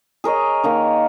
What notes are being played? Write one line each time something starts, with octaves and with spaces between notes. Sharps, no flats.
G#4 A#4 C#5 D#5
D#3 A#3 D#4